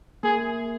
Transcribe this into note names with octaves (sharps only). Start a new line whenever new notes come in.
A#3 G#4